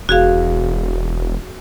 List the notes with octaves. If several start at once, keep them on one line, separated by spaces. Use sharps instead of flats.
E1 F#4 G#4 F5